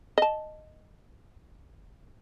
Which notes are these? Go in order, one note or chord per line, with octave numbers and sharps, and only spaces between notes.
D#5 A5